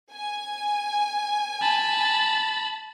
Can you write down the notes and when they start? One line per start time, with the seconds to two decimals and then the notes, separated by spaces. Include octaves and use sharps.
0.13 G#5
1.62 A5 B5